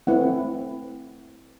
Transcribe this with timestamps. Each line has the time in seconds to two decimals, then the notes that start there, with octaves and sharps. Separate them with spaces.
0.07 A3 C4 E4 B4 F#5